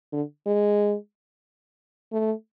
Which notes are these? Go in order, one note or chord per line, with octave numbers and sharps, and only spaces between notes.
D3
G#3
A3